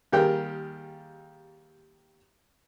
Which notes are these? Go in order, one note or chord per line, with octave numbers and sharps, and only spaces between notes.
D#2 G3 G4 G#4 A#4 G5